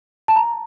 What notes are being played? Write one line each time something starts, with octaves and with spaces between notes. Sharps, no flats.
A5
A#5